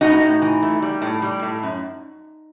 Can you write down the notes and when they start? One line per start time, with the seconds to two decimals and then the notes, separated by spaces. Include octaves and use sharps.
0.01 A2 D#4 F#4
0.21 A2
0.42 E3
0.63 A3
0.82 G3
1.02 A2
1.22 G3
1.42 A2
1.63 F#2